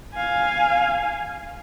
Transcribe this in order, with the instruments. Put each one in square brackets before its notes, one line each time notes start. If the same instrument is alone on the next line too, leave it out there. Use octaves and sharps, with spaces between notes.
[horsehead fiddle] F5 G#5